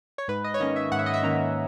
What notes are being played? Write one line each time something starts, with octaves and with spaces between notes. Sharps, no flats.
C#5
G#2 B4
D#5
C#5
D#3 A#3 C#4 D#5
E5
G#2 F#5
E5
D#5
E5
D#3 A#3 C#4 A#5